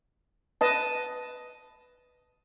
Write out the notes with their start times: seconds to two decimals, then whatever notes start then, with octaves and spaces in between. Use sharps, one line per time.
0.61 B4 D#5 A5